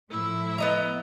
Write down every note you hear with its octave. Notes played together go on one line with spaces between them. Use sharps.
A2 F3 E4 E5
B3 D#5 A#5